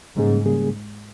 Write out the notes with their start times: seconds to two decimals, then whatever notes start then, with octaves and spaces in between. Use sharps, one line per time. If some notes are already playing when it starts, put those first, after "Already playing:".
0.16 G#2 C#3 G3 A#3 C#4 G#4
0.45 C#3 G3 A#3 C#4 G#4